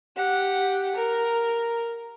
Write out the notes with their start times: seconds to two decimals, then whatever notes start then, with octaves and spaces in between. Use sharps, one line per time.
0.17 G4 F#5
0.95 A#4